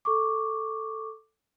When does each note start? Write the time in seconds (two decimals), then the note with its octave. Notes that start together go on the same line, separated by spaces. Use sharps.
0.05 A4 C#6 D6